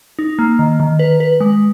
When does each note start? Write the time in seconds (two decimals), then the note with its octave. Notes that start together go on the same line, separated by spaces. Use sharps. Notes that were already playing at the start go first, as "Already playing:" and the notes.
0.19 D#4
0.39 A#3
0.59 D#3
0.80 D#3
0.99 B4
1.20 B4
1.40 G#3